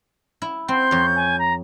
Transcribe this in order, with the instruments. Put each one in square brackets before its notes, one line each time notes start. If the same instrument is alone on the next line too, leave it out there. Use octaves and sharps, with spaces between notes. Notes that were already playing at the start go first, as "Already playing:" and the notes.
[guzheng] E4
[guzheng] C4 [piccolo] C6 [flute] G6
[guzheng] F2 C#5
[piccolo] G#5
A#5